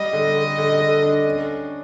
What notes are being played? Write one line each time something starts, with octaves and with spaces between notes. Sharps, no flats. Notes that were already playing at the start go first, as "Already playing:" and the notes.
Already playing: G3 D#5
D3
D3
D3
D3
D4
C#4